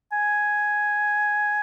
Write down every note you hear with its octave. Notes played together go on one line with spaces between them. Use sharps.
G#5